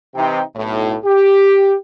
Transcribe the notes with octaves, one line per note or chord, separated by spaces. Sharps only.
C3 E3 D#4 G5
B1 A2
G4